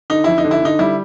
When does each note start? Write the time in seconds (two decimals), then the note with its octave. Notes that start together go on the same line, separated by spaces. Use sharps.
0.10 D3 D#4
0.24 F2 E4
0.38 D#4
0.44 D3
0.51 E4
0.62 D3 D#4
0.79 G3 E4